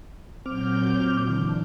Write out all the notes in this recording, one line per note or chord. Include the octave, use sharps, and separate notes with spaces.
A#2 F#3 C4 D6 F6 G6
D3 E3 D4